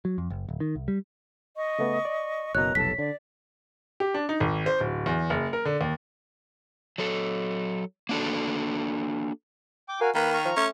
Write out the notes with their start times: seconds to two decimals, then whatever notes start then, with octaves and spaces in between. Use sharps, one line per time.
0.05 F#3
0.18 F2
0.30 F#1
0.49 D1
0.60 D#3
0.75 C2
0.88 G3
1.55 D#5 C#6
1.79 C#3 A3 B3
2.05 D5
2.55 F#1 B2 A#4 C#5 D#5 A#5 F#6
2.75 F1 B1 A4 A5 B6
2.98 D3 D5
4.00 G4
4.14 D4
4.29 D#4
4.40 G#1
4.66 C5
4.80 D1
5.06 E2
5.30 F#1
5.53 A#4
5.65 D3
5.81 D#2
6.98 F#3 A4
8.09 A#3 D4 F#4 A4
9.89 G5 D6
10.01 F#4 A#4 F5 G#5
10.15 D#3 A#3 B4 A#5 B5
10.33 A#5 C#6 F6
10.45 F3
10.57 A3 C#4